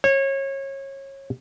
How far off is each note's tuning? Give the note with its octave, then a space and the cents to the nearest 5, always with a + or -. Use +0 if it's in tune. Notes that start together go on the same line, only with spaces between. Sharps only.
C#5 -25